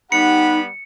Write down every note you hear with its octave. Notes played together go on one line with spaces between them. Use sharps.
G3 B3 D#4 G4 F#5 B5 C#7